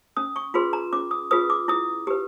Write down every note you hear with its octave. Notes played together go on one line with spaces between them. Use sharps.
C#4 D#6
C#6
F4 G#4 B4 C6
A#5
C#4 D6
D#6
F4 G#4 B4 D#6
D6
E4 D#6
G4 B4